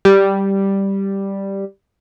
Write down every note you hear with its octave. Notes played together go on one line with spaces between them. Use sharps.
G3